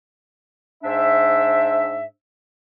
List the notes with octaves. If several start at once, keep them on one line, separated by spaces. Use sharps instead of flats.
G#2 D4 C5 E5